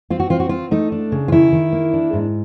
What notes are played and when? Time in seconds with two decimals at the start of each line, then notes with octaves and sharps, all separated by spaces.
0.10 C4 F4
0.20 F#4
0.30 C4 F4
0.40 F#4
0.49 C4 F4
0.71 A3 D#4
0.92 D4
1.12 C#3
1.28 F4
1.32 D#3 E4
1.52 D#3
1.73 A#3
1.93 D4
2.13 G#2